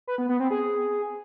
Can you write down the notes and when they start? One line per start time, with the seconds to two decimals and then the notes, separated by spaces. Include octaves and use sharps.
0.07 B4
0.18 B3
0.29 B3
0.40 C4
0.50 G#4